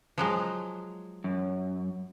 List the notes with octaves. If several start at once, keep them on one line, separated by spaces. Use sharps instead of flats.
F3 F#3 G#3
F#2